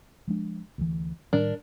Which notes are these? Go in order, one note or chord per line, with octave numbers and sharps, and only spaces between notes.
F3 G#3 D4
D2 E3
A2 D#3 G3 D4 A#4